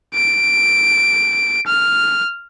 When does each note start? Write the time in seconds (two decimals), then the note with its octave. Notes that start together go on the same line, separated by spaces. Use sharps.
0.15 D7
1.66 F6